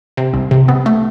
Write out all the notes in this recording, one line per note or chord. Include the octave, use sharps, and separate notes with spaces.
C3
C2
C3
B3
A3